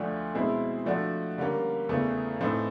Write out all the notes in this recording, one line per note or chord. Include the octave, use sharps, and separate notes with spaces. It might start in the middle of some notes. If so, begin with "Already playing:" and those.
Already playing: D2 D3 F3 A3 D4
B2 G#3 C4 E4
F3 A3 D4 F#4
D3 G3 A#3 C#4
E2 C#3 E3 A3
A2 E3 A3 C4 D#4